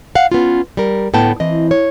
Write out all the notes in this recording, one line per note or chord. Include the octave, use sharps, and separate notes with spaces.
F5 F#5
B3 C#4 F4
G3 A#4
D2 A2 B3 G5 A5
E3 C4 D#5
C#5